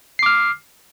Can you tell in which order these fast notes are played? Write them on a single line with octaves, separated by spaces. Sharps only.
C7 D6 F6